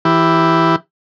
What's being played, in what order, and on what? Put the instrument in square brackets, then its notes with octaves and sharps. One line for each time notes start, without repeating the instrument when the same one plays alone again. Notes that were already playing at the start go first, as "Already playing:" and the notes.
[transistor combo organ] E3 E4 G4